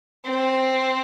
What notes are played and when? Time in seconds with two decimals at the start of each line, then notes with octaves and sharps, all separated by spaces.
0.25 C4